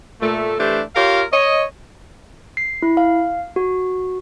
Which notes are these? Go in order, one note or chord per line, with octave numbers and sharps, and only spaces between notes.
A#2 A3
E3 A3 D4 G4 C5
F4 G4 A#4 C#5 F5
C#5 D#5
C7
E4
F5
F#4